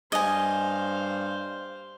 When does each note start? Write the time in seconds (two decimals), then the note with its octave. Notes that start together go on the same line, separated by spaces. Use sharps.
0.12 G2 C5 D#5 F5 G#5